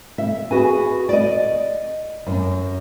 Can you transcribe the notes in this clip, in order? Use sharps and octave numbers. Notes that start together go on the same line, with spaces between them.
E5
F#4 G#4 B4 G#5
D5 D#5
F#2